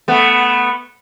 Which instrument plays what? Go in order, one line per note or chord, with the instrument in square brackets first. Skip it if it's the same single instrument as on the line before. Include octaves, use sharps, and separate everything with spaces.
[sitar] A3 B3